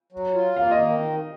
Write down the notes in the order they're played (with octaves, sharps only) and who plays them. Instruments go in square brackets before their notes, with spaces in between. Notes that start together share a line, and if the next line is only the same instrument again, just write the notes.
[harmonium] F#3
F4
[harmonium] A#3 [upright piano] F5
[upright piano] D#5
[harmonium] D#3